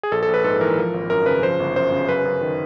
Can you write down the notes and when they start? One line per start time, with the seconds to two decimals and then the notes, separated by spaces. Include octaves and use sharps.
0.03 G#4
0.12 A#1 A4
0.23 A4
0.28 A#1
0.34 B4
0.44 G#2 A4
0.61 E3 A#4
0.77 F3
0.94 G#1
1.10 F#2 A#4
1.26 C#3 B4
1.43 F3 C5
1.60 G1
1.76 F#2 C5
1.92 C#3
2.09 F#2 B4
2.25 F#2
2.41 D#3